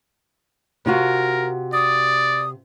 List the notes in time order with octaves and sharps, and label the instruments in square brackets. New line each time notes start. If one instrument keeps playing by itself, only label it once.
[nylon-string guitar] C3 F4 F#4 [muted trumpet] A#4
[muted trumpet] D5 [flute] D#6